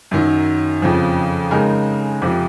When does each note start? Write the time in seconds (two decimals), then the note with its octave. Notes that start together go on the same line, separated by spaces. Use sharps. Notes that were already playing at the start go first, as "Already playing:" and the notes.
0.11 F#2 D#3 F#3
0.82 F2 C#3 F3
1.51 C#3 G#3 D#4 A#4
2.22 F2 C3 F3